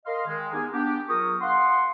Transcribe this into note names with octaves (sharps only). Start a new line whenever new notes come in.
A#4 D#5 F5 C6
D#3 G#3
B3 D#4 G4 G#4 A#4 G#5
B3 D4 G4
F#3 F4 G#4 A#4 C#6 D#6
F5 F#5 C6